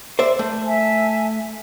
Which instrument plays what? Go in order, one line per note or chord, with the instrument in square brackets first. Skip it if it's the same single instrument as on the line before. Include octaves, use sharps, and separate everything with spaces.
[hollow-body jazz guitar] C5 D5 E5
A3
[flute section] E5 G#5 A5